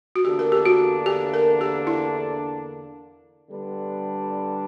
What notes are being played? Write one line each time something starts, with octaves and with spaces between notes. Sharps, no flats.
F#4
E2 D3 A#3 D4 G4
A#4
G4
F#4
G4
A#4
G4
E4
D3 G3 B3 D4